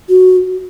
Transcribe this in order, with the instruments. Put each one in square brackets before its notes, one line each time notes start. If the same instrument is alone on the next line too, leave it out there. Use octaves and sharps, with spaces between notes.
[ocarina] F#4